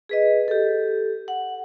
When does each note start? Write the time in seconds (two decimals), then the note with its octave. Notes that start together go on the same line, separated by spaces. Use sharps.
0.09 G#4 B4 D#5
0.48 G4 A4
1.28 F#5